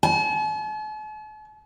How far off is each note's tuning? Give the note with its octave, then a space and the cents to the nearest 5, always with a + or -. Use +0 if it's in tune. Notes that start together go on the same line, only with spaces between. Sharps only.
A5 -45